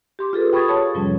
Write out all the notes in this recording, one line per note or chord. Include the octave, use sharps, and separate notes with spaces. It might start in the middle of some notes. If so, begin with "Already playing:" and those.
G4 C6 D6
F4 G#4 A4 B4
G5 B5 C#6 D#6 G#6 A6
G#4 C#5 F5 A5 D#6
F2 G#2 C3 F3 G3 C#4